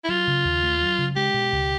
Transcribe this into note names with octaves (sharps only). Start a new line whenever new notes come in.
E4
F#3 F4
C#3
D#2
A3
F#3
C#3
G#3 G4
B2
C#2